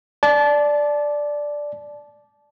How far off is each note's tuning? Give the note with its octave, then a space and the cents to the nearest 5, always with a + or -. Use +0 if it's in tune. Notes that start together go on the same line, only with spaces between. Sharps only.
D5 +0 A5 -25